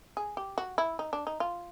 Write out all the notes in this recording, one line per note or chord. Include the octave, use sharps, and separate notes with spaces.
G#4
G4
F#4
E4
D#4
D4
D#4
F4